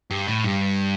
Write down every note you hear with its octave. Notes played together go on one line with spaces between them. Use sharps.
G2
A2
G2